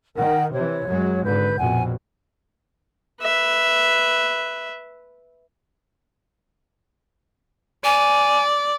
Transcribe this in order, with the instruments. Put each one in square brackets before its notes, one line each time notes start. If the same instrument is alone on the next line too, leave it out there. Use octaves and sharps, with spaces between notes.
[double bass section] D#3 [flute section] A#4 F#5 G5
[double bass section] C3 E3 [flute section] C#5
[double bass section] F#2 F#3 G#3
[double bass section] G#1 D3 [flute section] B4 G6
[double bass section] A#1 F2 B2 [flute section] F#5 G#5
[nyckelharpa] B4 E5
[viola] D5 [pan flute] G#5